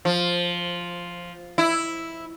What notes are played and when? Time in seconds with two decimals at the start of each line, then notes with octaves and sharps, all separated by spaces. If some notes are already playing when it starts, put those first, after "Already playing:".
0.05 F3
1.58 E4